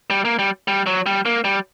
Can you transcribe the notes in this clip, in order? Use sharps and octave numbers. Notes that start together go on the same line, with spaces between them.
G3
A#3
G3
G3
F#3
G3
A#3
G3